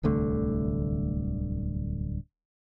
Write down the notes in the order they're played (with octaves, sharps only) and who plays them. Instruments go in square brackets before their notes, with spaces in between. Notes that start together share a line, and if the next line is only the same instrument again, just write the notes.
[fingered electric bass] D1 C2 D3 A3